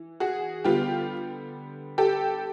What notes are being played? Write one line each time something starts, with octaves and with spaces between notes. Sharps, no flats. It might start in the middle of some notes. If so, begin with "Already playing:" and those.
Already playing: E3
F#4 G#4
D3 G3 B3 F4 G4
G4 A4